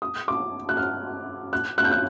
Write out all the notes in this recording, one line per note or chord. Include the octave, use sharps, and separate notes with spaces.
D#6
D6
F#6
F6
F#6
F#6
G6
F#6